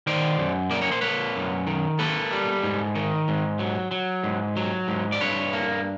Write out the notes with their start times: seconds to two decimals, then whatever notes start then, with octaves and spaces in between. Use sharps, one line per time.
0.07 D#3 C5 D5
0.39 F#2
0.71 A#3 D5
0.82 C#5
0.92 C5
1.01 A#3 B4 C#5
1.36 F#2
1.67 D#3
1.99 A#3 A4 B4
2.31 G3
2.64 G#2
2.95 D#3
3.28 G#2
3.59 F#3
3.91 F#3
4.24 G#2
4.56 F#3
4.88 G#2
5.12 D5
5.20 G2 B4 C#5
5.53 A#3